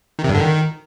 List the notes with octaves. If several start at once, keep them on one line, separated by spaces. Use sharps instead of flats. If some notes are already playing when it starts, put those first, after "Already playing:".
D#3
C3
G2
D3
D#3